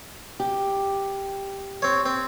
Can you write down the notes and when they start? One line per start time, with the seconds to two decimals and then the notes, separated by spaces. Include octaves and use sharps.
0.40 G4
1.82 C4 C#5
2.06 C4